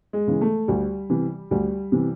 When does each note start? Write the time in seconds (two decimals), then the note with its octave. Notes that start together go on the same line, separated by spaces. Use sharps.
0.13 G#3
0.27 C#3 E3
0.41 A3
0.68 D2 G3
1.10 C3 E3
1.51 D2 G3
1.92 C3 E3